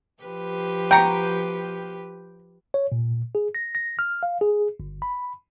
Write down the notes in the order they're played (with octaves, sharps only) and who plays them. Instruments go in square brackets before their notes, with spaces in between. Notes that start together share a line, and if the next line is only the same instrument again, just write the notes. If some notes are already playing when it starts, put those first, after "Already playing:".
[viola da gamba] F3 G4 B4
[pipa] B2 A#5 C#6 [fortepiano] G5
[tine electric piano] C#5
A#2
G#4
A#6
A#6
F6
F5
G#4
G1
B5